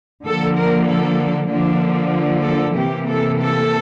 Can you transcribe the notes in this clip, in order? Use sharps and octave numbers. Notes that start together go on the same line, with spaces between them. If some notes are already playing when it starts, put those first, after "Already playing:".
D3 F3 A#3 A4
A#4
A4
D3 F3 A#3 D4
A4
C3 E3 A#3 G4
A4
A4